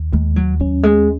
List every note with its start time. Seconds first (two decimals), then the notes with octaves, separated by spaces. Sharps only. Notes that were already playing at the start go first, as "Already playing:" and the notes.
Already playing: D#2
0.13 D#2 G#3
0.36 F#3
0.60 F#3 C#4
0.83 G#3